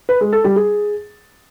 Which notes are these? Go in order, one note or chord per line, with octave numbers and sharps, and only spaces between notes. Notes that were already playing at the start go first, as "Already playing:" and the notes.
B4
G#3
A4
G3
G#4